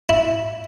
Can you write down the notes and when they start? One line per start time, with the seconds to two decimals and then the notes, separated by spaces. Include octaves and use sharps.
0.09 E4